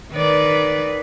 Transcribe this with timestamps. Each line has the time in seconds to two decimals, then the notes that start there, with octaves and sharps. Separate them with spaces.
0.12 D#3 B4 D5